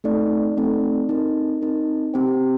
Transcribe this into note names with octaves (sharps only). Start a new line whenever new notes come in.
A3 C4 D#4 A4 D5
A3 C4 D#4 A4 D5
C4 D#4 A#4
C4 D#4 A#4
C4 G4 C5 G5